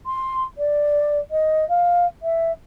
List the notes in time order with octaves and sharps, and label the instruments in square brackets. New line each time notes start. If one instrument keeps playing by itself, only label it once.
[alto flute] C6
D5
D#5
F5
E5